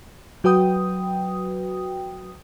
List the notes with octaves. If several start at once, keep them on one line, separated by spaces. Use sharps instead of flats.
F#3 F#4 B4 G5 D#6